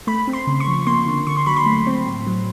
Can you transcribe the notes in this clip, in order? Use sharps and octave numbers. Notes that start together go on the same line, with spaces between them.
A3 B5
C4
C6
C#3
C#6
F3
A#3 C6
D3
D3 C#6
C6
F#3 B5
C6
A3
C4
A2
F#3